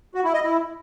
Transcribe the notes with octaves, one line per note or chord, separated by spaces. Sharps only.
F#4
E4
D#5
E4